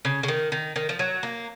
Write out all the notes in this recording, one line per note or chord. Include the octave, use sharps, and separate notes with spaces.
C#3
C#3
D#3
D#3
D#3
F3
F#3
A#3